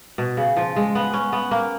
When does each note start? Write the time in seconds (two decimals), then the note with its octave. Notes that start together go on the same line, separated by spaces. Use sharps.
0.18 B2
0.37 C#3
0.57 F3
0.76 G#3
0.95 B3
1.14 C#4
1.33 B3
1.51 A#3